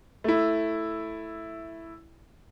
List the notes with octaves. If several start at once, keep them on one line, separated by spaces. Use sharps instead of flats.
A3 E4